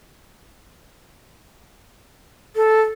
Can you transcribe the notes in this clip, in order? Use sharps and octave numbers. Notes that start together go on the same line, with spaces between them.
A4